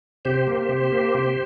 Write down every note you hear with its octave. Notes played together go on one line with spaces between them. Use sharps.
C3 G4 C5
A#3
C3
A#3
C3